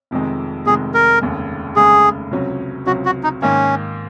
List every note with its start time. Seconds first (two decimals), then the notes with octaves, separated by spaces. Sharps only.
0.11 F1 F2 C3 D#3 G#3
0.66 F1 F2 C3 D#3 G#3 G#4
0.94 A#4
1.21 F1 D#2 C#3 G#3
1.76 F1 D#2 C#3 G#3 G#4
2.31 C#2 C3 F#3 C#4
2.86 C#2 C3 F#3 C#4 F#4
3.05 F#4
3.23 D#4
3.42 G#2 D#3 A#3 C#4